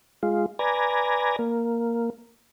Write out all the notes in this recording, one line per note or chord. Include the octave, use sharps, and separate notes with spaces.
G#3 F4
B4 D5 G#5 A#5
A#3